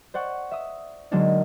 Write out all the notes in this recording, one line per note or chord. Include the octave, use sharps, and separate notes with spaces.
C5 D5 F#5 C#6
E5 D#6
D3 F#3 G#3 A#3 D4 D#4